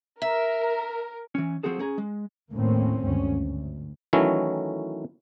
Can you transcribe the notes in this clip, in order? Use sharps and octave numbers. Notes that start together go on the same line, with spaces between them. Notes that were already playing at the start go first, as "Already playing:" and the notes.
A#4 E5
E3 C#4
F3 C4 F#4 G#4 A4
C#4 G#4 A#5
G#3
D#2 A2 A#3 C4 C#4
G#1 D2 G2 C#4
D2
D#3 E3 F#3 A3 C#4 E4